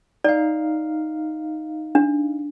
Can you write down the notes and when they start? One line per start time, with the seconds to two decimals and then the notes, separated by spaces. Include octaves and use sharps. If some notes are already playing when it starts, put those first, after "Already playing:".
0.24 D#4 D5 F5
1.95 D4